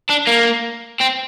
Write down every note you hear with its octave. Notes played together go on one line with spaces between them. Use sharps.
D4
A#3
C4